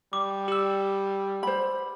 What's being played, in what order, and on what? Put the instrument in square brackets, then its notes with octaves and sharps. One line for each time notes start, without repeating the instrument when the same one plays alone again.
[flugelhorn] G3 [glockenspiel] D6
[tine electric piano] G4 E6
[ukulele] C5 B5